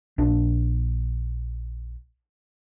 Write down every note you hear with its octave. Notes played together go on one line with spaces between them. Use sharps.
A#1 D4